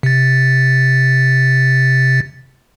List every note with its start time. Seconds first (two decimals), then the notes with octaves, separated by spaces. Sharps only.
0.03 C3 A6